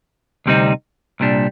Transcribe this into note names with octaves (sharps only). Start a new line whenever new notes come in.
D2 C3 G3 C4 D#4
C2 A#2 G3 D4